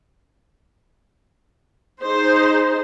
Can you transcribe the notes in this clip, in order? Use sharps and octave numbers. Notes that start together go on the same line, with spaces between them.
D#4 G#4 C5